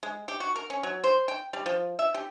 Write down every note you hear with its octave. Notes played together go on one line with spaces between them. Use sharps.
G#3
G4
F#4
A#4
C#4
F#3
C5
G5
G3
F3
E5
G4